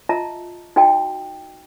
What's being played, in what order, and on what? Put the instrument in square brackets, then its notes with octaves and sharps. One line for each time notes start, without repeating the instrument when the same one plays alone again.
[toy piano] F4 D#5 E5 A5 A#5
D#4 F#4 D#5 G5 A5